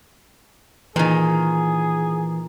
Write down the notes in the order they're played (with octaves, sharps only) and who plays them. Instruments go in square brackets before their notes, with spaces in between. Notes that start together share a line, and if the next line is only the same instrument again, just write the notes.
[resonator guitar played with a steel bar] A#2 D#3 [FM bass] E3 [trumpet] G#4